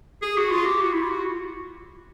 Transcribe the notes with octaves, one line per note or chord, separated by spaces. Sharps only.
G#4
F#4
F4
G4
F#4
E4
F4
F#4